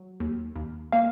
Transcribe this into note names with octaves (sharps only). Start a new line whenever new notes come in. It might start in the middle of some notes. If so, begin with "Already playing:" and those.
Already playing: F#3
D#2
D#2
A#3 F5